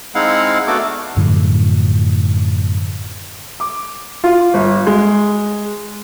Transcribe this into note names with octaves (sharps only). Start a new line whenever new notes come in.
G#3 C4 D#4 E4 F5 F#5
A3 B3 D4 F#4 A4 D6
F#2 A2 D3 F3
D6
F4
G1
G#3